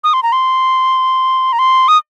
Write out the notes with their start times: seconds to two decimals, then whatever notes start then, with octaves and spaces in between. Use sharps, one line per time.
0.04 D#6
0.13 C6
0.23 A#5
0.32 C6
1.53 A#5
1.59 C6
1.88 D#6